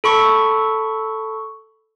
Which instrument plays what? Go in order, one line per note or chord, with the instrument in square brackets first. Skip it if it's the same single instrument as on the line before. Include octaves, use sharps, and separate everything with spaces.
[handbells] A4 B5 C#6